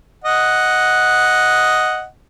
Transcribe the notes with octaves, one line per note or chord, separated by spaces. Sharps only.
D#5 F#5